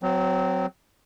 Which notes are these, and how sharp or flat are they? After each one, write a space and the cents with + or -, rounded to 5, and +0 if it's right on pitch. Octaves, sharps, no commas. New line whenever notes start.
F#3 +0 C4 -25